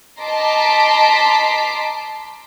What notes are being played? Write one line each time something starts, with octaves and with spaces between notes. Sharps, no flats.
D#5 A5 A#5 C6 D6 B6